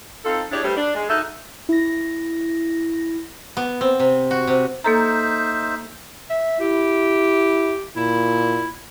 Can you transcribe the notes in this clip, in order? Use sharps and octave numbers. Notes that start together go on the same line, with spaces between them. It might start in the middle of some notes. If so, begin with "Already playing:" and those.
C4 D#4 F4 A4
D4 E4 G4 G#4 C#5 D5
G3 A3 D4 G4 B4 C5
D4
G#3
D#4 F#4 A4 E5
E4 A#6
B3
C4
C3
F#4
C3
A#3 D#4 A4 C5 E5 A#5
E5
E4 G4
A#2 E4